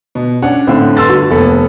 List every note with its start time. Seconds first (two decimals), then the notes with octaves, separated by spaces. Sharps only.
0.15 B2
0.42 C#4 D4 F#5
0.67 A2 D3 C4
0.97 G1 D3 C6 E6 A6
1.09 F#4
1.31 F1 A#3 B3 A4